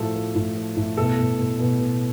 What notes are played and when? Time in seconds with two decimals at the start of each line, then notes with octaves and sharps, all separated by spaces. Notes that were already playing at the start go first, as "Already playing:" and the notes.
Already playing: A2 F3 A4
0.15 F3
0.35 A2
0.56 F3
0.76 A2
0.97 B2 A4
1.18 B2
1.38 B2
1.59 B2
1.79 B2